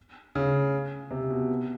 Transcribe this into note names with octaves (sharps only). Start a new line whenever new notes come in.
C#3
C3
B2
B2